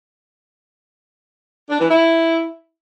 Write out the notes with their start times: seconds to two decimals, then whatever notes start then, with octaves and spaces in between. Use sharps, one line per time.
1.70 D4
1.80 E3
1.90 E4